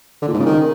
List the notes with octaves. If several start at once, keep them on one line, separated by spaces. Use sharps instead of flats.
D3
A#2
G#2
C#3
D#3